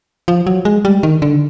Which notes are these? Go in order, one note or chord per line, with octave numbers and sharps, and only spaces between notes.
F3
F#3
G#3
G3
D#3
D3